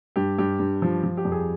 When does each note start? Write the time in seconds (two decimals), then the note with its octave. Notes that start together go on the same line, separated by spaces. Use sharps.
0.16 G2 G4
0.38 G2 G4
0.59 G2
0.82 F3
1.03 F3
1.17 G4
1.25 F2
1.32 G#4